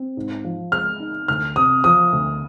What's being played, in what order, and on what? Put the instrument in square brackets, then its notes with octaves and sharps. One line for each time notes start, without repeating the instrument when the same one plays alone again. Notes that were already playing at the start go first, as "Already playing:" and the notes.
Already playing: [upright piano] C4
G#2
F3
[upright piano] G#3 [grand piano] F6
[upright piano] D#4
[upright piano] D2 [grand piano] F6
[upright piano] C3 [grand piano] D#6
[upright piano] F3 [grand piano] D#6
[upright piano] D2